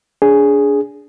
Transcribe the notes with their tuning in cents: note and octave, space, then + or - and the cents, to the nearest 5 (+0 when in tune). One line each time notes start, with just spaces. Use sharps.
D4 -30 G#4 +0